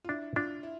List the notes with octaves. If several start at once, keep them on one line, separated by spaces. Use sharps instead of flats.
F4
D4 E4
D4 F4
E4